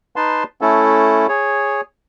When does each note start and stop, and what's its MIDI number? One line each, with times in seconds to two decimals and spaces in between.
0.16 0.43 63
0.16 0.43 71
0.16 0.43 81
0.16 0.43 84
0.61 1.27 57
0.61 1.27 61
0.61 1.27 64
0.61 1.27 69
1.29 1.81 68
1.29 1.81 73